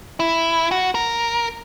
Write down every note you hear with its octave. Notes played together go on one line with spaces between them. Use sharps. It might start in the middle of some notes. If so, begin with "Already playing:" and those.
E4
F#4
A#4